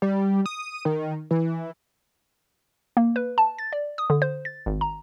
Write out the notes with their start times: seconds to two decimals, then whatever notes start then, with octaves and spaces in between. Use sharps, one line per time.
0.02 G3
0.46 D#6
0.85 D#3
1.31 E3
2.97 A#3
3.16 B4
3.38 A5
3.58 A6
3.73 D5
3.98 D#6
4.10 D3
4.22 C5
4.45 A6
4.66 G#1
4.81 A#5